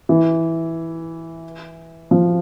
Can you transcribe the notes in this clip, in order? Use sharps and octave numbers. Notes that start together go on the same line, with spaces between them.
E3
F3